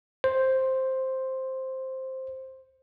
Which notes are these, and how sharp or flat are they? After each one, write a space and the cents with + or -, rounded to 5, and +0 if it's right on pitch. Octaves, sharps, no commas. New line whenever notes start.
C5 +5